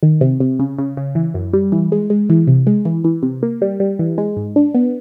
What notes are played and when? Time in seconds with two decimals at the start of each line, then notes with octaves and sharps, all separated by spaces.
0.03 D#3
0.21 C3
0.40 C3
0.59 C#3
0.78 C#3
0.97 C#3
1.15 E3
1.34 F#2
1.53 G3
1.72 E3
1.92 G#3
2.10 G#3
2.30 E3
2.47 C3
2.67 G#3
2.85 E3
3.04 E3
3.23 C3
3.43 A#3
3.62 G3
3.80 G3
3.99 E3
4.18 G#3
4.36 G#2
4.56 D4
4.75 B3